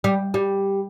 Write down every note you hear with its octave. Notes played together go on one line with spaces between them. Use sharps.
G3
G3